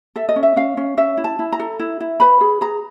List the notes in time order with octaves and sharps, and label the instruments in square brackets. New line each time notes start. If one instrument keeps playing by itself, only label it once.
[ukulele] A4 E5
D#5
C#4
E5
C#4 F5
C#4
C#4 E5
E4
A5
E4
A#5
A4
E4
E4
B4 B5
G#4
G#4 A#5